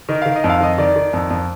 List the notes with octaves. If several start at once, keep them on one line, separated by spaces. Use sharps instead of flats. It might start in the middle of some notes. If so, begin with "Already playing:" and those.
D#3 D#5
D#3 F5
D#5
F2
F5
D#3 D#5
D#3 D5
D#3
F2
F2